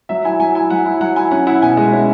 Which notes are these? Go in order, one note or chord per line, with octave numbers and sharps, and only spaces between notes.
F#3 E5
E4 G#5
F#3 G#5
E4 G#5
F#3 F#5
E4
F#3 F#5
E4 G#5
C#4 F#5
E4 F#5
B2 G#5
G#3 F#5
C#4 E5